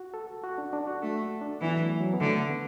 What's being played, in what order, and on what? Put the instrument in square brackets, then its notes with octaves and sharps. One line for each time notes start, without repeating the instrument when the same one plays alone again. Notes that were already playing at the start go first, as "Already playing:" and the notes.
Already playing: [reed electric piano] F#4
A4
F#4
D4
D4
F#4
[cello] A3 [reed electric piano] A4
[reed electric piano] F#4
D4
[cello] E3 [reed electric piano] B3
[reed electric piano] F#3
A3
F#3
B3
[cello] D3 [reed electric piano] A3
[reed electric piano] B3